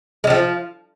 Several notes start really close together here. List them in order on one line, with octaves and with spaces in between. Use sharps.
G#3 G3 F3